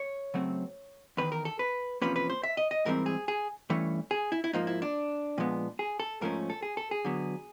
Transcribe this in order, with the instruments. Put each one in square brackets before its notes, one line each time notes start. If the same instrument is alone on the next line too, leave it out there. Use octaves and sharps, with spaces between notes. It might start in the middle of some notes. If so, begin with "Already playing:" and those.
Already playing: [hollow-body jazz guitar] C#5
C#3 F#3 A3 C4
E2 C3 D#3 B4
A#4
A4
B4
E2 C3 F3 A#3 C#4 B4
B4
C5
E5
D#5
D#5
G#2 E3 G3 C4 A#4
G#4
G#4
G2 E3 A3 C#4
G#4
E4
E4
G#2 F3 A#3 D#4
E4
D4
A#2 F3 G#3 B3
G#4
A4
G#2 F3 A3 C#4 A#4
A4
G#4
A4
G#4
D3 F#3 B3